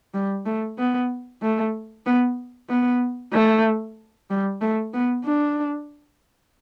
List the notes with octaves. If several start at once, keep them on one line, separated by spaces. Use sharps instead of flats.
G3
A3
B3
A3
B3
B3
A3
G3
A3
B3
D4